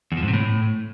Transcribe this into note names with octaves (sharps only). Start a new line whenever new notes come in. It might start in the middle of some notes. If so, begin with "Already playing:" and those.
E2
F3
G#2
C3
A2